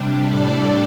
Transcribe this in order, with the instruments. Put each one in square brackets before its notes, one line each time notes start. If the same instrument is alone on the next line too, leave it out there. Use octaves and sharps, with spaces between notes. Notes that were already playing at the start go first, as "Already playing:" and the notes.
Already playing: [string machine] C3 G3 D4
A2 G3 D4 A4 D5